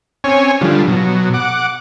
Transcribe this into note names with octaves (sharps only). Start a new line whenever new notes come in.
C4 C#4 C#5 G#5
D3 F3 G3
B2 F#3
F#5 D6